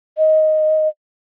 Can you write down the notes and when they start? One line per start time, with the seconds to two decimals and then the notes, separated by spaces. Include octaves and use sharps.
0.18 D#5